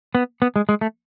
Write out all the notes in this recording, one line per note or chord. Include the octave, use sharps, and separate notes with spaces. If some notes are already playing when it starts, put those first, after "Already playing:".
B3
B3
G#3
G#3
A3